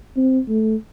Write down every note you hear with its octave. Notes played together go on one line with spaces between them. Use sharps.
C4
A3